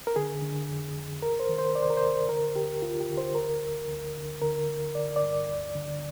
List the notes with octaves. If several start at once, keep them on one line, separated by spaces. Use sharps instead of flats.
A#4
D3 G#4
D3
F2
F2
D2 A#4
C5
D#3
C5
D2 D5
C5
A#4
C5
D2
D3 A#4
D2 G4
D2 F4
G4
D3
C5
D2 A#4
D2
D2
D3
D3 A#4
D3
D3 D5
D5
G2
D2
D3